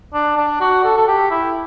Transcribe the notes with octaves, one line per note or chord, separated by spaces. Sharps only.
D4
D4
F#4
A4
A4
G4
E4